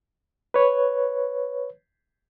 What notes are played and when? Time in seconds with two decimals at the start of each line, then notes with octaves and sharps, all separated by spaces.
0.54 B4 C#5